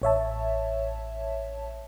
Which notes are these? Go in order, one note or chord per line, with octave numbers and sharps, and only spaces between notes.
A1 C#5 E5 A5